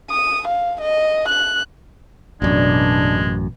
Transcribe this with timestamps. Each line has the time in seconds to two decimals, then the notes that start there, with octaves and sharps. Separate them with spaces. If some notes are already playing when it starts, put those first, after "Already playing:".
0.11 D#6
0.48 F5
0.82 D#5
1.29 F#6
2.42 A1 F#2 B2 G#3 D4